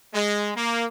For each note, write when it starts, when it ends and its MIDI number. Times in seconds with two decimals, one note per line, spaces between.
0.14 0.50 56
0.55 0.85 58